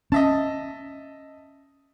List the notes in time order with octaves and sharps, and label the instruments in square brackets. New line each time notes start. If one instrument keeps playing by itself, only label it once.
[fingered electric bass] C#4 [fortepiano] D#5 E5 A5